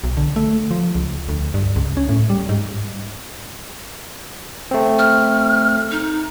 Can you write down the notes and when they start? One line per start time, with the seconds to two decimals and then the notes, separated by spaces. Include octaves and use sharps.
0.04 B1
0.17 D3
0.36 A3
0.71 F3
0.95 C#2
1.29 D2
1.54 G2
1.76 C#2
1.97 C#4
2.09 A2
2.30 G3
2.49 G#2
4.71 A3 C4
4.99 F6
5.91 D#4